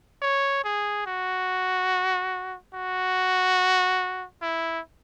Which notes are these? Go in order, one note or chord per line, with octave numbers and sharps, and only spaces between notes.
C#5
G#4
F#4
F#4
E4